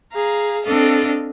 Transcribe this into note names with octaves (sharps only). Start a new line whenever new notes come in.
G#4 F5 A#5
C4 D4 A4 D#5 F5